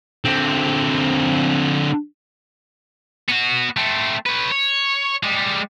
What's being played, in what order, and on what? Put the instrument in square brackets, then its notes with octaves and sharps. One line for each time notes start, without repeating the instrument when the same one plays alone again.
[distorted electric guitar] D3 C4
B3 F#4
A3 C4
B4 C#5
C#5
G3 G#3